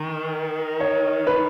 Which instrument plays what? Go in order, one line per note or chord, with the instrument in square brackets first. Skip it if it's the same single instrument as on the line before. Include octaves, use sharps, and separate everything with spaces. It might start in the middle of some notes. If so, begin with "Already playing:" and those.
Already playing: [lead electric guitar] D#3
[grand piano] C#5
B4